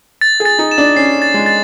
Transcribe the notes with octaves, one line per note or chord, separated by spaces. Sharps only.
A6
G#4
A6
D#4
E7
D4
C#4 C7
A6
G#3
A6